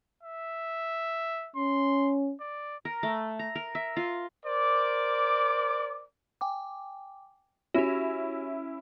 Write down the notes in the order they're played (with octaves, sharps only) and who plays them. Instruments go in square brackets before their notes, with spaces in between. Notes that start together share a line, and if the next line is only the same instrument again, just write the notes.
[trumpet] E5
[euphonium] C#4 [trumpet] C6
[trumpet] D5
[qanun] A#4
A3
A#5
A#4
E5
F4
[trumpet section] A#4 C5 D5 D6
[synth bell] G5 G#5 D6
[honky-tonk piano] C#4 E4 [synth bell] F#4 G4